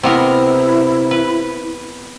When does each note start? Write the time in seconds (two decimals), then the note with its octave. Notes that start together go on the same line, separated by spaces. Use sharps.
0.03 C3 B3 E4 A#4
1.11 B4